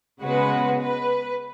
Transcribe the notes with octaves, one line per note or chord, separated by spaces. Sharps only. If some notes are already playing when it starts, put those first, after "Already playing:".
C#3 G#3 B3 F#4 B4
B4